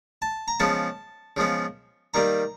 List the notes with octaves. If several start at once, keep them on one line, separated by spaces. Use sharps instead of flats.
A5
A#5
C#3 F3 G#3 B3 A5
C#3 F3 G#3 B3
D#3 G3 A#3 A#5